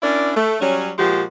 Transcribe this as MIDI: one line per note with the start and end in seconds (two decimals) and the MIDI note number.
0.03 0.32 61
0.03 0.32 62
0.03 0.32 64
0.03 0.32 70
0.03 0.32 74
0.36 0.57 57
0.60 0.90 54
0.60 0.90 55
0.60 0.90 61
0.99 1.23 46
0.99 1.23 53
0.99 1.23 56
0.99 1.23 66
0.99 1.23 67